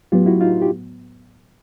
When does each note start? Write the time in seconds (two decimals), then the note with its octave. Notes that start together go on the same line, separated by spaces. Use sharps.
0.12 A2 F#3 B3 F4 G4
0.26 E4 F#4
0.41 D#4 F4
0.62 G4